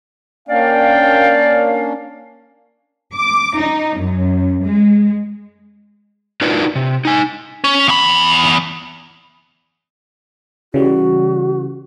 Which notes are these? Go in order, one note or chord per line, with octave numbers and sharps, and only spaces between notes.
A#3 C#4 D4 D5 F5 G5
D6
D#4
F#2
G#3
D4 D#4 F4 F#4 A#4 B4
C3
D#4 G#5
C#4
E2 B5
C#3 E3 G3 F#4